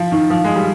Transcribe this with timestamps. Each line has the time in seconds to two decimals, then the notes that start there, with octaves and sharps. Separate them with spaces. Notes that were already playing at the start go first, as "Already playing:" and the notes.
Already playing: F3
0.12 D#3
0.30 F3
0.44 G#3
0.56 G3